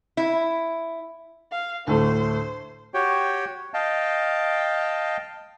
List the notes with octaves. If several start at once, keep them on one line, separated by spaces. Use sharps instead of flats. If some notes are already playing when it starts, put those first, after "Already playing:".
E4
F5
D2 A2 A3 C5
F#4 G4 C#5 G5
D#5 F5 G5 A5